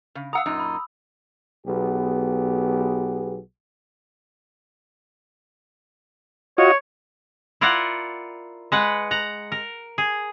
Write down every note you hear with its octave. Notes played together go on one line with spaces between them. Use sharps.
C#3
F5 F#5 A#5 D#6 E6
F#2 A#2 D#4
B5
B1 B3 G4 G#4
F4 F#4 C#5 D#5
E4 F4 A#4 D5 F#5
G#3 B4 F#5
F#5 A#5
A#4
G#4